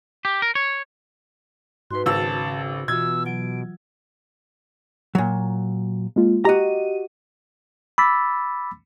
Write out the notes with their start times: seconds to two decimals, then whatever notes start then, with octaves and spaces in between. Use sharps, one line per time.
0.25 G4
0.42 A#4
0.55 C#5
1.91 G#2 F#4 B4 C6
2.06 G#1 C#3 A5 E6
2.88 B2 E3 F4 E6 G#6
3.26 F#3 D7
5.15 A#2 F#3
6.16 G#3 A#3 F4
6.45 F#4 G4 D#5 A#5 D#7
7.98 B5 D6 E6 A6 B6